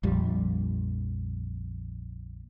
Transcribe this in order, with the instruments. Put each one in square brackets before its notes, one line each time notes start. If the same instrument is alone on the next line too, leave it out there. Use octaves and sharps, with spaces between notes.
[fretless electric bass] A#1 F2 G3